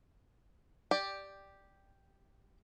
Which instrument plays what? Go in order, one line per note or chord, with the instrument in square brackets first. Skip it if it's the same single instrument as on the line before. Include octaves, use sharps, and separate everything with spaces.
[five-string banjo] G4 D5 G5